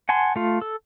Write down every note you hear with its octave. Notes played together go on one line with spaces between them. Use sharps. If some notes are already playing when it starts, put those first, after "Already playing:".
F#5 G#5 A5 C6
A3 F4
A4